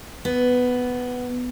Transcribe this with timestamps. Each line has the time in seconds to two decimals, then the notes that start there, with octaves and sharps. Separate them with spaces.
0.25 B3